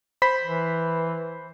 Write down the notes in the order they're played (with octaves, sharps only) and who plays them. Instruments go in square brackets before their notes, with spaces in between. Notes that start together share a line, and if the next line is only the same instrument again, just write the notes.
[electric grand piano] C5 B5 B6
[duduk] E3